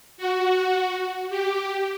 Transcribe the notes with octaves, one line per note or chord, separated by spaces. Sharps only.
F#4
G4